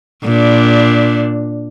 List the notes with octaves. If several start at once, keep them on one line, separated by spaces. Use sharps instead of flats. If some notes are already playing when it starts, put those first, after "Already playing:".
A#2 D4